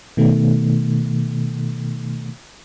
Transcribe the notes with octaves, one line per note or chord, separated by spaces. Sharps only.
B2 D#3 A3